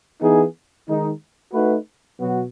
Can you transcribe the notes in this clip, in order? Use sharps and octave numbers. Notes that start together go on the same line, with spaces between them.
E3 B3 D#4 G#4
D#3 G#3 D#4
A3 D#4 F#4 B4
B2 F#3 B3 F#4